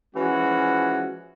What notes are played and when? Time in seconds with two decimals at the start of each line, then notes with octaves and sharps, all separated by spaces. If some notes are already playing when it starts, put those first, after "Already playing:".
0.15 E3 F3 G#3 C#4 E4 F#4